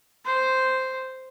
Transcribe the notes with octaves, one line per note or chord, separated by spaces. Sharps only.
C5